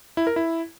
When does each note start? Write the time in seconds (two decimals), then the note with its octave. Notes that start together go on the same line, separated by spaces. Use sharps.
0.17 E4
0.27 A#4
0.36 E4